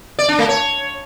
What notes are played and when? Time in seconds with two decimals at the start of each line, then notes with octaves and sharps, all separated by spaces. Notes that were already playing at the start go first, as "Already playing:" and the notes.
0.19 D5
0.29 D4
0.39 A3
0.49 C#5